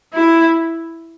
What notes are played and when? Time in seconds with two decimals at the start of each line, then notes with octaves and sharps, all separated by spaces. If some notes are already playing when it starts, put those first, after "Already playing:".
0.13 E4